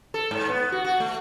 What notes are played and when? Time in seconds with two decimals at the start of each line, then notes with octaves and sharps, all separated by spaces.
0.14 A4
0.31 G#2
0.49 B3
0.72 F#4
0.85 F#4
1.00 A3